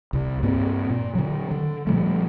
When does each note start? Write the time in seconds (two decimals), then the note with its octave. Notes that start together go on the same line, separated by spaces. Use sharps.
0.13 C2 C3
0.43 G2 A#3 C4
0.90 A#2
1.15 D3 F#3
1.51 D3
1.87 A#2 F3 G3 A3